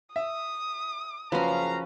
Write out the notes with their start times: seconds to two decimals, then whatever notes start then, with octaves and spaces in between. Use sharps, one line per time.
0.16 E5 D#6
1.32 F#1 F3 C#4 F#4 B4 F5 A#5